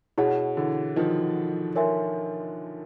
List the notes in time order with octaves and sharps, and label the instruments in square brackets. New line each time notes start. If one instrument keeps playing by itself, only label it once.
[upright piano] B2 [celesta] E4 G#4 C#5 F#5
[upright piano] D3 E3
D#3 F3
[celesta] A#4 C#5 E5 G#5 C6